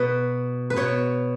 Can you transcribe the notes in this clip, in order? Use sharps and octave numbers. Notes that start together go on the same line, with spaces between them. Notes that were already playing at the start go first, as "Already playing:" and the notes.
Already playing: B2 B4
B4
B2 C#5